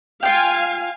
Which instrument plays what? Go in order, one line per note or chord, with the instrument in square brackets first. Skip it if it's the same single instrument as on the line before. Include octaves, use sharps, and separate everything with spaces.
[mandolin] F4 G5 [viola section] F5 G#5